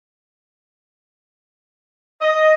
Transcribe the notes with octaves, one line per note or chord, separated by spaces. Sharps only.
D#5